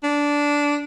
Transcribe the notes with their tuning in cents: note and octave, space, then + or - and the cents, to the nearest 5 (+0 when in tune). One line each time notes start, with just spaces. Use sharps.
D4 -10